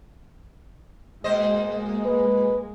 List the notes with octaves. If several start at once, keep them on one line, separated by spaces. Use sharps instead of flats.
B2 G#3 A#3 C5 D#5
B4